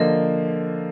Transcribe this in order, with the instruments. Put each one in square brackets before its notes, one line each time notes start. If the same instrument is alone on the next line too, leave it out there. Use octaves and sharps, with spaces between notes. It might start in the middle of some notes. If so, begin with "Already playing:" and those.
Already playing: [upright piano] D3 F3 A#3 [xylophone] D#5